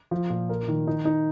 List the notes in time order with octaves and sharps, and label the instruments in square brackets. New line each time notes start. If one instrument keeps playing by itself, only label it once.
[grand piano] F3
A#2
A#4
D#3
D#4
D#4